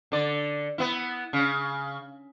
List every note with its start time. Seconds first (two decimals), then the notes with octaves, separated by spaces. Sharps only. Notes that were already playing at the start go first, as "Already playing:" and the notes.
0.12 D3 D5
0.78 B3 E4
1.33 C#3